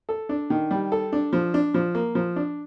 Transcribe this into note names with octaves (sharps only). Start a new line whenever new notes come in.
A4
D4
D#3
G3
A4
D4
F3
D4
F3
A#3
F3
D4